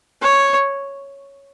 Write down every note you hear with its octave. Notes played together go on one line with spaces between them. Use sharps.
C#5